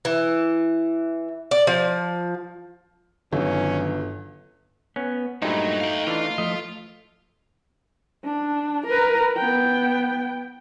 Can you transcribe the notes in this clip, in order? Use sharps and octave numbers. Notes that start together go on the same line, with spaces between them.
E3
D5
F3
G1 D#3 F#3 C#4
B3 C#4
G2 A#2 F#3 A3 D#4 C5
F5 G5
E3 D4 F4
F3 A3 D#5
D4
A#4 B4
B3 G5